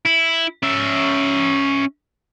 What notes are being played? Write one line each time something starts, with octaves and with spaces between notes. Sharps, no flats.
E4
C#4 E5